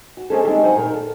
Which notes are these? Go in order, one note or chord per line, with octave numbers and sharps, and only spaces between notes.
F#4
G#3 A#3 C4 C#4 G#4 A4
D#3 G3 G#3 C4 D4
C3 F#3 D#4 C5 F#5 G#5
A#2 D#3 A#4
A4